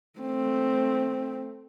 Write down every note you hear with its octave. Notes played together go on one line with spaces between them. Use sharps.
A3 C4